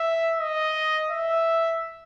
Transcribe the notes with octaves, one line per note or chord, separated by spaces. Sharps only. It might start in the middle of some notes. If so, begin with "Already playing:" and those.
Already playing: E5
D#5
E5